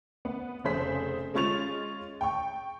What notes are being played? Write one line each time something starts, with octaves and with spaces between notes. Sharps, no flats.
B3
F1 C#3 G#4 C5 B6
G#3 C#4 F4 C#6 A6 F7
G5 C#6